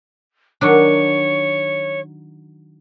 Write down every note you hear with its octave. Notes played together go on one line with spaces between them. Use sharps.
D#3 F#3 D4 C#5